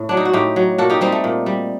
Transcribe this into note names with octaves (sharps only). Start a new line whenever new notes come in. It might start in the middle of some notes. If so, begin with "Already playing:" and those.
Already playing: A2
F#3 D4
D#4
F#4
A2 D#4 G4
F#3
A#2 F#4 A4
D#4 G4
G3 C4 D#4
A3
A#2
G3